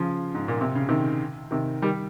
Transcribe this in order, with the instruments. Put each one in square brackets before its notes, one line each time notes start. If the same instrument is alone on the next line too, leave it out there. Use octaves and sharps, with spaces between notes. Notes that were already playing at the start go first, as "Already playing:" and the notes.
Already playing: [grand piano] C#3 F3
G#2
A#2
C3
C#3
C3 D#3
C3 D#3
D#3 G3